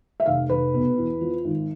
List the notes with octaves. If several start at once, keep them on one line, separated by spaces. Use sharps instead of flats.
E5
F1 F5
F1 B4
B2
E2
F3
G#1